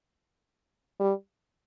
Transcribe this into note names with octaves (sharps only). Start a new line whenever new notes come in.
G3